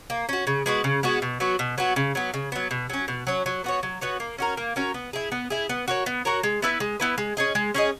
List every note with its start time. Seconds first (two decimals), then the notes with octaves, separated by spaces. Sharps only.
0.10 A#3
0.29 C#4 F#4
0.47 C#3
0.66 G#3 B3 F#4
0.84 C#3
1.03 G#3 B3 F#4
1.22 B2
1.40 F#3 B3 F#4
1.59 B2
1.78 F#3 B3 F#4
1.96 C#3
2.15 F#3 B3
2.34 C#3
2.52 F#3 B3
2.71 B2
2.90 F#3 C#4
3.08 B2
3.27 F#3 C#4
3.46 F#3
3.64 B3 F#4 C#5
3.83 F#3
4.01 B3 F#4 C#5
4.20 A#3
4.38 C#4 F#4 A#4
4.57 A#3
4.76 C#4 F#4 A#4
4.94 B3
5.13 E4 G#4
5.32 B3
5.50 E4 G#4
5.69 B3
5.88 F#4 A#4 C#5
6.06 B3
6.25 F#4 A#4 C#5
6.43 G#3
6.62 B3 E4 B4
6.80 G#3
7.00 B3 E4 B4
7.18 G#3
7.37 C#4 G#4 D#5
7.55 G#3
7.74 C#4 G#4 D#5